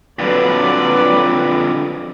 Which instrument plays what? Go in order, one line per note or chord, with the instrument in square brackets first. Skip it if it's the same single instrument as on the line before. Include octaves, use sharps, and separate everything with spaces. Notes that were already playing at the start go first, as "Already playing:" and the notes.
[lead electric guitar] F2 D3 [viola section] F#3 B4 D5